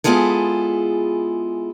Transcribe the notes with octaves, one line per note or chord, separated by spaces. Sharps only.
G#3 B3 E4 F4 G#4 A4